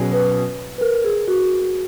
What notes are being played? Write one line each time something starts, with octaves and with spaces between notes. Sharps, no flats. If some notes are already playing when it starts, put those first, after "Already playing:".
Already playing: B2 F#3 C#4 G#4
B4
B4
A#4
G#4
F#4